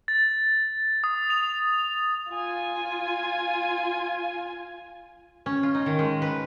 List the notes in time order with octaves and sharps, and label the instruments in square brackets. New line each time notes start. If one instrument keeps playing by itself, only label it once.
[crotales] A6
D#6
F7
[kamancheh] F4 G#5
[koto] C#4
F4
D#4
D#3
G#3
B4